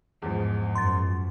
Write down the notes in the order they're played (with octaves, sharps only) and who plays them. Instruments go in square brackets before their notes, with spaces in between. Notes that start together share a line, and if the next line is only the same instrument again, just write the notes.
[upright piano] E2 F3 [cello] G#2
[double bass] F#2 [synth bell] C6 A6